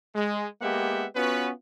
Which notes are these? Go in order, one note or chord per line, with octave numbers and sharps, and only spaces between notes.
G#3
G#3 A#3 B3 G4 E5 F#5
B3 C#4 F4 F#4 B4